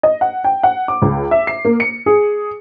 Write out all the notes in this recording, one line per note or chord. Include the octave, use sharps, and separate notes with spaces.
D#5
F#5
G5
F#5
D6
C#2
E5
C7
A#3
C#7
G#4